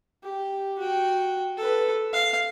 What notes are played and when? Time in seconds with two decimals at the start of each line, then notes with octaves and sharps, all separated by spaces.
0.23 G4
0.79 F#4 G5
1.57 A4 B4
2.13 F5